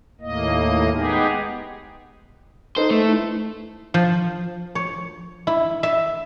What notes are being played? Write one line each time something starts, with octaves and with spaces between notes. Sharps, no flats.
D#2 A2 A#3 D#5
G#3 B3 D#4 G4 G#4
D#4 A4 B4 C5
A3
E4
F3
C#5
E4
E5